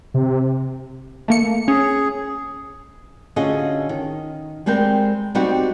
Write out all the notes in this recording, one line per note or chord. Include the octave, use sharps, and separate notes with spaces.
C3
A3 A#3 C#7
C#4 G#4
D3 C#4 F4 F#4 G#4 D#5
D#3
G3 G#3 C4 A#4 G5
G3 B3 C4 D#4 F#4 G4